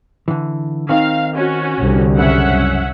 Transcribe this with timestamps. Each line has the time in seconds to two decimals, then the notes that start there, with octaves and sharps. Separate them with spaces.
0.28 D3 E3
0.89 D#3 C4 D#4 F5
1.35 C#4 F#4
1.80 C2 D3
2.19 F#2 A2 C#3 C#4 E5 F#5